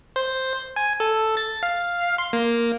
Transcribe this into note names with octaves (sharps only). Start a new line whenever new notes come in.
C5
G#5
A4
A6
F5
C6
A#3